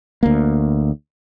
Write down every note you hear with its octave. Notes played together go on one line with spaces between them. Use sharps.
D2 A#3